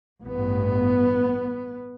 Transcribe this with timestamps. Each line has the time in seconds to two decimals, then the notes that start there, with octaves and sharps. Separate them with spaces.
0.23 A1 G2 B3